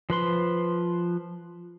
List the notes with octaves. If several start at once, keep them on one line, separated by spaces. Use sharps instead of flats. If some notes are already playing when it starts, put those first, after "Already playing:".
F3 B4 C6